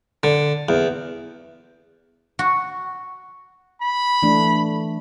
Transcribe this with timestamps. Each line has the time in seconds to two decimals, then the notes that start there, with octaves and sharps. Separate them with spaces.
0.23 D3
0.69 E2
2.39 F#4
3.82 B5
4.23 E3 A3 D4